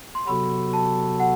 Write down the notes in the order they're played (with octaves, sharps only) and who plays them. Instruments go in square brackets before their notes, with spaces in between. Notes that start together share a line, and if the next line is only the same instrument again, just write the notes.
[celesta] C6
[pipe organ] C3 F#3 B3 F#4 A4 [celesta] B5
[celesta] A5
F#5